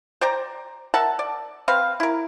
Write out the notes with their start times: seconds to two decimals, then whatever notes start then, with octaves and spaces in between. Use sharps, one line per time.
0.21 C5 D5 G5 A#5
0.94 A#4 E5 F#5 A5
1.19 D5
1.68 C4 B4 F5
2.00 E4 A#4